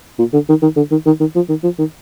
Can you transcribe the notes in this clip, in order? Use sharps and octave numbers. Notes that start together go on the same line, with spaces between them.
A#2
D3
D#3
D#3
D3
D#3
D#3
D#3
F3
D#3
F3
D#3